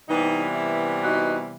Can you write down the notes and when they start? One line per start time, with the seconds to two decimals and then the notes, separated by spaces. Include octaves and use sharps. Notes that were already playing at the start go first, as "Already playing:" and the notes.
0.08 C3 E3 G3 B3 D#4
0.55 E4
1.02 D#4 F#4